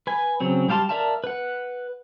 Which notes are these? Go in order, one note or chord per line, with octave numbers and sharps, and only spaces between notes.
B4 G#5
C#3 F#3 C4
G3 G4 F5 A5 C6
A#4 D5 E5 F5 A5
B4 F#5